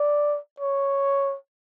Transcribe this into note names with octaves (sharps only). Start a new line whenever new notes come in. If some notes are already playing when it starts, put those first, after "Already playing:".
Already playing: D5
C#5